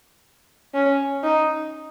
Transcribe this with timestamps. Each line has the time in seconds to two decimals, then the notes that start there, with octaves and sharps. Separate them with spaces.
0.74 C#4
1.23 D#4